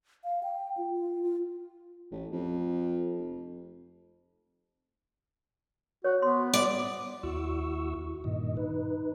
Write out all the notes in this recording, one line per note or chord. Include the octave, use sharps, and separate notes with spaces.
F5
G5
F4
F4
F4
A1
F2
F1
F#4 C#5
B3 C5 C6
D5
D#2 E4 F#4 C#6 E6
G2 A#2 D#3 D#5
D#4 B4